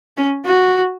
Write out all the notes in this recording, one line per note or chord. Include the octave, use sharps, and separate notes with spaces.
C#4
F#4